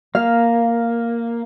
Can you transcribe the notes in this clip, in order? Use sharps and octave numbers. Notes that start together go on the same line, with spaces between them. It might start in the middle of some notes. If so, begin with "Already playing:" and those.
A#3 F5